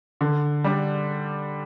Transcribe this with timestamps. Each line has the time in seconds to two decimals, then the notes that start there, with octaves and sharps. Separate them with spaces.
0.21 D3
0.64 G3 D4